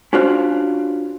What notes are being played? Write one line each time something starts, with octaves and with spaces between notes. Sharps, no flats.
C#4 D4 F4 F#4 C5